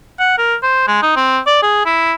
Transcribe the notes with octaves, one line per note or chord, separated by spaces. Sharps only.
F#5
A#4
C5
G#3
D#4
C4
D5
G#4
E4